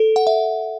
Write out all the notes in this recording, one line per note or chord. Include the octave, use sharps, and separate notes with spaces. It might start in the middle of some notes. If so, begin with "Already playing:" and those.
Already playing: A4
F#5
E5